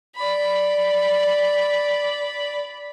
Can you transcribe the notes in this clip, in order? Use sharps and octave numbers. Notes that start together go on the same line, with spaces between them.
D5 B5